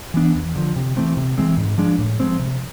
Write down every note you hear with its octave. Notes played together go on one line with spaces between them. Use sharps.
E3 B3 D4
E2
D3 F3
C3
E3 A3 C4
C3
E3 G#3 C4
G#2
F3 G#3 D4
A2
F3 G#3 C4
C3